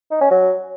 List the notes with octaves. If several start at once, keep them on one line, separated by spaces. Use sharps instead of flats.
D#4
C#4
F#3